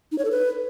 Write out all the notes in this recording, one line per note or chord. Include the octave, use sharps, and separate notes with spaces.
D#4
C#5
A4
B4